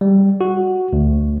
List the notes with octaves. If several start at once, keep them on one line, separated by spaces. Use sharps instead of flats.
G3
F#4
D2